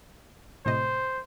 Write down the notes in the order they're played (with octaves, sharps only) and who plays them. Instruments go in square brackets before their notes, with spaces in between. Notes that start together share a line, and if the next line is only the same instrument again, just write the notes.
[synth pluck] A2 C3 D#5 [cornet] C5